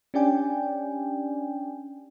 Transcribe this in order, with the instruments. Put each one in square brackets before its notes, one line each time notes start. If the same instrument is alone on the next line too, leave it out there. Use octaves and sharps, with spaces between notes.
[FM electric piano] C#4 D4 G4 D5 G5 G#5